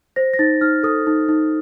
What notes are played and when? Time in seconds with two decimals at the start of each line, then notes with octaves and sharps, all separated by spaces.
0.16 C5 A#6
0.34 A#6
0.39 D#4 A6
0.61 D#4 F6
0.83 A4 D#6
1.07 D#4
1.28 D#4